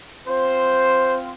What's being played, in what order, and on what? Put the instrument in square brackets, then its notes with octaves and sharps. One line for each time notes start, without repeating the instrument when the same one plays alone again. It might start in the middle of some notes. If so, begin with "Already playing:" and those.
[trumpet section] C4 F4 C5